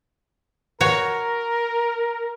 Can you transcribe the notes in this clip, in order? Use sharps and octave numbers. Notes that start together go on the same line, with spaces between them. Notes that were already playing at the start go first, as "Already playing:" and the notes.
F#4 A#4 C#5